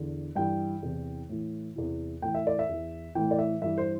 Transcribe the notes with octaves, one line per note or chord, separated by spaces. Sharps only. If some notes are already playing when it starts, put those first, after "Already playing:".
Already playing: E2 D3
G2 E3 G5
E2 C3 E3
A2 E3
E2 C3 E3
A2 E3 G5
E5
D5
E5
E2 E3
A2 E3 G5
D5
E5
G2 E3 E5
C5